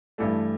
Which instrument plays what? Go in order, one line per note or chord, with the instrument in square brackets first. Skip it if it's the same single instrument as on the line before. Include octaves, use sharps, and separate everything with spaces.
[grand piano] G2 E3 A3